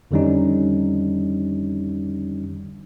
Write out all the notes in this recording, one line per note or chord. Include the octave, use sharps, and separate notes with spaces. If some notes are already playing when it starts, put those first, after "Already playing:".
F2 D3 D#3 G3 C#4 D#4